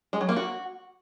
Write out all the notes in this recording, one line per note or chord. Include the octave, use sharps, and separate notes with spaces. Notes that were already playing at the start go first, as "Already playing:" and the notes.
G#3
F#3
A#3
F#4